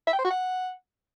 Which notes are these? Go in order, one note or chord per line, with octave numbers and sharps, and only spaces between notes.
E5
G5
C5
F#4
F#5